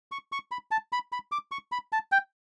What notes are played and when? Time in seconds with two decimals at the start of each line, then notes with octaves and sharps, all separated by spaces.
0.12 C#6
0.32 C#6
0.51 B5
0.71 A5
0.93 B5
1.12 B5
1.32 D6
1.52 C#6
1.72 B5
1.93 A5
2.12 G5